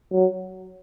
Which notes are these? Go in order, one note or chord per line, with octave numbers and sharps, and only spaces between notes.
F#3